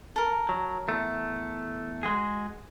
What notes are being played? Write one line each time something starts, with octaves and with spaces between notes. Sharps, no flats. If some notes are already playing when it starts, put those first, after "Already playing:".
A4 A#4
F#3
E2 A3
G#3 F#4 G#4